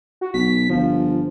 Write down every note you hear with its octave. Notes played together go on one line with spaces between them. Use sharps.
F#4
B1 B6
G1 F3